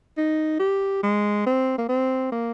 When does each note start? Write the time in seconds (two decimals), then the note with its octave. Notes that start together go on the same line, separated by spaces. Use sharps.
0.18 D#4
0.60 G4
1.03 G#3
1.47 C4
1.78 A#3
1.89 C4
2.32 A#3